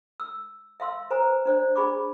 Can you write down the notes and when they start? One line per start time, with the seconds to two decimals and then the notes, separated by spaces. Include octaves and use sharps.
0.20 E6
0.80 E5 F5 C6 E6
1.10 B4 C5 G#5 A#5
1.45 D4 C5 D5
1.76 D4 G#4 B5 C#6 D6